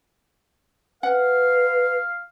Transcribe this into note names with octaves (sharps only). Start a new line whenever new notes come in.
B4 F5 F#5